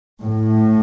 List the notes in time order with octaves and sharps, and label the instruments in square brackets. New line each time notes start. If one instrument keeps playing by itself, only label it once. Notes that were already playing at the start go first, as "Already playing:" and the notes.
[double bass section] A2